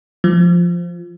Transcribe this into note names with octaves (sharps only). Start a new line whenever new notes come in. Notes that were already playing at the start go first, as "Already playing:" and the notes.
F3